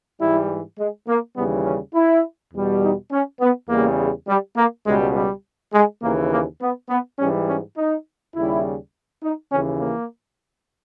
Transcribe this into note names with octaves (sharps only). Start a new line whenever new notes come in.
G#2 E3 G3 E4
G#3
A#3
D#2 C#3 E3 G3 B3
C#4
E4
E2 B2 G3
D#4
C#4
B3
E2 C#3 G3 A#3
G3
A#3
C#2 B2 G3 G#3
G3
G#3
D#2 C#3 E3 A#3
A#3
B3
B3
G#2 E3 G3 C#4
C#4
D#4
D#2 C#3 G3 E4
D#4
D#2 C#3 E3 C#4
A#3